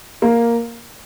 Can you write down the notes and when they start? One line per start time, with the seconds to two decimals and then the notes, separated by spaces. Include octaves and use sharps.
0.22 A#3